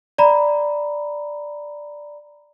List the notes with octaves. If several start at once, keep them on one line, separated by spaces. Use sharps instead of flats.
D5 A#5 B5